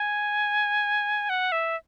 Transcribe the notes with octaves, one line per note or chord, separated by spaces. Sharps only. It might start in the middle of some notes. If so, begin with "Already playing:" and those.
Already playing: G#5
F#5
E5